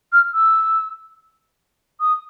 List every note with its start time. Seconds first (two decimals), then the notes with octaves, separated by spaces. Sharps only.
0.12 F6
0.33 E6
2.00 D#6